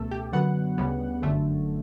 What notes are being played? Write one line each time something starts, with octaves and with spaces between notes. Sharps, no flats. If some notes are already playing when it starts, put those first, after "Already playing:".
Already playing: C#2 B2 A3 A4
G4
F#2 D3 F#3 B3 F#5
D2 C#3 G3 B3
G1 F#2 D3 A3